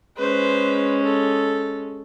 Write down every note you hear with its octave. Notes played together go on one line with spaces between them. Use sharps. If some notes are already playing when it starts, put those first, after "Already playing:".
G#3 C#4 B4 C5
A4